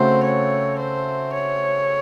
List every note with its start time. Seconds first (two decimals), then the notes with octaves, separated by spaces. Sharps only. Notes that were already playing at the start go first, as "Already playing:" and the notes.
Already playing: C#3 A3 C4 F#4 C5
0.24 C#5
0.79 C5
1.33 C#5